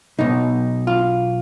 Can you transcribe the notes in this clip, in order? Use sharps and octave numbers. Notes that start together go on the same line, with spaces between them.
B1 B2 D#4
F4